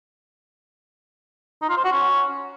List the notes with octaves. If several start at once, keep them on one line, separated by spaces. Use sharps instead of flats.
D#4
F4
C5
F#4
C#4